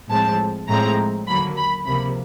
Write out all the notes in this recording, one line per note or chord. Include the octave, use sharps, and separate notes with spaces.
A2 F3 G#3 C4 A5
A2 F3 G#3 C4 A#5
D#2 D3 F#3 A#3 B5
B5
C#2 C3 F3 A#3 B5